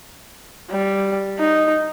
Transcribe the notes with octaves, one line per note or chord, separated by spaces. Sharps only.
G3
D#4